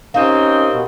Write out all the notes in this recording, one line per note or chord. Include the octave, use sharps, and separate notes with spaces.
A#3 C4 C#4 D#4 G4
B2